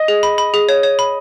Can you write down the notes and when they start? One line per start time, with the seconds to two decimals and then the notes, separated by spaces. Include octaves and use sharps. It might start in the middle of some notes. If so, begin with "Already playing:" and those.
Already playing: D#5
0.08 G#4
0.23 B5
0.38 B5
0.54 G#4
0.69 C#5
0.83 C#5
0.99 B5